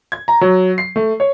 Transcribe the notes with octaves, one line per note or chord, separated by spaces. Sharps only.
G#6
A#5
F#3
C7
A3
C#5